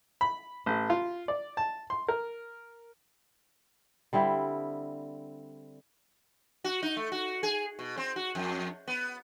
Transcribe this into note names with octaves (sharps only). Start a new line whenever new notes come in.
B5
A1
F4
D5
A5
C6
A#4
D3 G3 C4 E4
F#4
D#4
A3
F#4
G#4
B2
C4
F#4
F2
B3